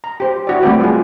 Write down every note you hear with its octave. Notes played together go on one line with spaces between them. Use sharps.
A#5
G4 C5
E4 F#4 D5
G3 A3 C4 B4 D5 G5
F4 G#4